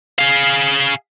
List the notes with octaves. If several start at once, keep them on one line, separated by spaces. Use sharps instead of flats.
G#4 F5